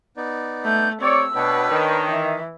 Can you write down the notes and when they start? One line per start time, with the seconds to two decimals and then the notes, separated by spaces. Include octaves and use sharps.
0.17 B3 D#4 D5
0.65 A3 G6
1.02 C4 G4 C#5 D5 E6
1.35 B2 D4 B4 C#5 G5
1.71 D#3
2.08 E3 E5